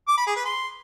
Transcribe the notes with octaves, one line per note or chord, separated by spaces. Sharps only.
D6
B5
G#4
B4
C6